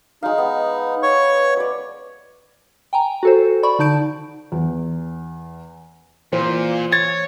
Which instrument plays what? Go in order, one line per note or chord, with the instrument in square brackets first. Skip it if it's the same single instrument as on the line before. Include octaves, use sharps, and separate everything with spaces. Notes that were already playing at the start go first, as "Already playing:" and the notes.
[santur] G#3 F5 [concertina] D#4
[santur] B3
[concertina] C#5 C#6
[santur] B4 D5
[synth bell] G5 G#5 A#5
F#4 A4 C5
D5 B5 C#6
D3 D#4 A5 G6 D7
[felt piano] E2
[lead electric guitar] A#2 [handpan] E3 C5
[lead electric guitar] C#5 [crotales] G#6 [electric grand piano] A6